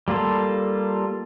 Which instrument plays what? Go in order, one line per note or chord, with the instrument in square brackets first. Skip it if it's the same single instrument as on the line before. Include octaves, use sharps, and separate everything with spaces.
[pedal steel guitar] G3 A#3 F4 A4